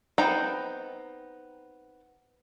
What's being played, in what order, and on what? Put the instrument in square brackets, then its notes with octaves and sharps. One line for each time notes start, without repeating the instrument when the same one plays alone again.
[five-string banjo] B3 C4 D#4 G5 A#5